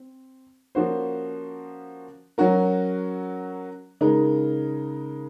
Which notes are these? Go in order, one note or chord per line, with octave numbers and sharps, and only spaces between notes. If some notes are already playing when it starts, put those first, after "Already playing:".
Already playing: C4
F3 A#3 C#4 F#4 C5
F#3 C#4 F#4 A#4
C#3 G#3 D#4 A#4